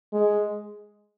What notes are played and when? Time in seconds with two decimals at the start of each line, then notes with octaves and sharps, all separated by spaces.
0.13 G#3